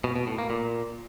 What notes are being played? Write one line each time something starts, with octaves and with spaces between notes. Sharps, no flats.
B2
B2
A2
A#3
A#2